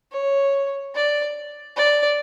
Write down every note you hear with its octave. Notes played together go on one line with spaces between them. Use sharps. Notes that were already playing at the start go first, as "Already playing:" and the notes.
C#5
D5
D5